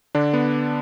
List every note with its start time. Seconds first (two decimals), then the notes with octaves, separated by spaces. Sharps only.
0.15 D3 D4
0.34 B3